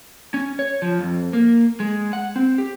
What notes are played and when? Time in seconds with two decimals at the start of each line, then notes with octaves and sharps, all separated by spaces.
0.34 C#4
0.59 C#5
0.82 F3
0.99 F2
1.33 A#3
1.80 G#3
2.13 F#5
2.36 C4
2.58 G4